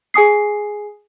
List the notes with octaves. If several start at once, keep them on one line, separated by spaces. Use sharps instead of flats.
G#4 G#5 D#6 C7